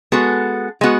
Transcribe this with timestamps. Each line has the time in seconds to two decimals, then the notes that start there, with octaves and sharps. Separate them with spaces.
0.12 G#3 B3 F#4 A4
0.81 G#3 B3 F#4